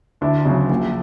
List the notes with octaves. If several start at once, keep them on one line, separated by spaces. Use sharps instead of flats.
D2 D4 E4
C#3 F#3
A#1